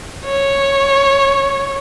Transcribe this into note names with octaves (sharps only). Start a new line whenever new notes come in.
C#5